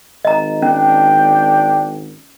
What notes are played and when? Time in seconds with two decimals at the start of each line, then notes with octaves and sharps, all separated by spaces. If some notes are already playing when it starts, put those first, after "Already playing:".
0.25 G#1 D#5 A#5
0.62 C#4 D4 G5